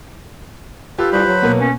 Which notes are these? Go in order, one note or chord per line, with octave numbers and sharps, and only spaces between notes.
F4 G4 A4 B4
C2 B4 C5 B5
F#3
B2 A#3 B3
C#4